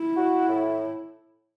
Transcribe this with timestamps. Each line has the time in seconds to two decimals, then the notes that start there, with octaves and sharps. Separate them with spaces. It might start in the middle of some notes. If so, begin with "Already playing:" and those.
Already playing: E4
0.17 F#4
0.49 A2